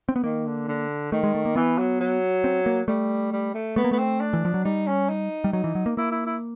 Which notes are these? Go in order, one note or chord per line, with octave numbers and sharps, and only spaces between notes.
C4
B3
D#3 A#3
D3
D3
D#3 A3
G#3
A3
A#3
E3 B3
F#3
F#3
C4
A#3
G3 A3
G3
A3
A3 B3
A#3
A3 B3
C4
D4
E3
F3
F#3
G3 D#4
C#4
D#4
G3
F#3 D#4
E3
F#3
A#3
A#3 E4
E4
E4